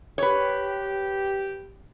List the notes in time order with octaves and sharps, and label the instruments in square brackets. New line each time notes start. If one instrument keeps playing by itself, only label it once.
[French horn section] G4 [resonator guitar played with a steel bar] B4 C#5